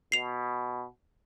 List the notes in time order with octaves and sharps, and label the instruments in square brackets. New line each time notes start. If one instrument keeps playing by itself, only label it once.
[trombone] B2 [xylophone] C7 F7